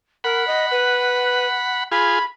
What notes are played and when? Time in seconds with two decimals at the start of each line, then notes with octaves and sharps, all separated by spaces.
0.24 A#4 F#5 B5
0.47 D#5
0.71 B4
1.92 F4 G#4 B5